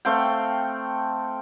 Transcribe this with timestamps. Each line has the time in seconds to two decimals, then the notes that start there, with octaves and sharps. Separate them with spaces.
0.05 A3 C4 F5 G5